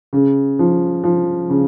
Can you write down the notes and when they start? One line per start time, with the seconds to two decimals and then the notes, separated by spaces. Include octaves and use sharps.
0.13 C#3
0.59 F3
1.04 F3
1.50 C#3